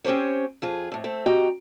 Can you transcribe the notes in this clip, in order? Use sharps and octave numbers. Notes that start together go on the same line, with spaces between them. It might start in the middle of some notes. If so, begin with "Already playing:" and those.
C4 C#4 G4 C5 C#5
F2 F4 G#4
F2 A2
A3 C4
C4 F#4 G4 D#5 G5 A#5